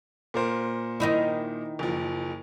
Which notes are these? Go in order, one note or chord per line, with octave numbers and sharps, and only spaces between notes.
A#2 A#4 C5
D#3 D#4 E4
F#1 F3